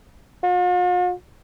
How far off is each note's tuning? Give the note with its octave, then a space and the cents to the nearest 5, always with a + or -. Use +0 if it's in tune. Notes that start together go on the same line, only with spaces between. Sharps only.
F4 +45